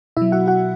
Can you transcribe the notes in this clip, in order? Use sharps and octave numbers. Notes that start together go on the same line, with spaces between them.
B2 F#3 E4 E5
F#4 F#5
F#4 F#5